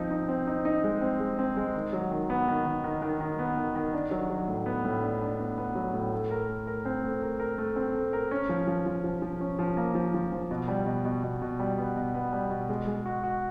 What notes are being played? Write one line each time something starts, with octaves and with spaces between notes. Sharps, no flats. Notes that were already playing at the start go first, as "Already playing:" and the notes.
Already playing: F3 C4 D#4
D#4
C4
D#4
D#4
G#3
C4
G#3
C4
G#3
D#3
F#3
D#3
B3
D#3
D#3
D#3
D#3
D#3
B3
D#3
D#3
D4
F#3
F#3
A2
B3
A2
D4
D4
B3
B3
F#3
A2
A3
A#4
A3
A#4
C4
A3
A#4
A#4
A3
C4
A3
A#4
C#4
F3
F3
F3
F3
F3
C#4
F3
A#3
F3
F3
F3
B2
G3
B2
B2
B2
B2
G3
B3
B2
B3
G3
B2
G#3
G#3
F#4
F#4